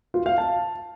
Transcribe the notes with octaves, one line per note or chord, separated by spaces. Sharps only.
F4
F5
A5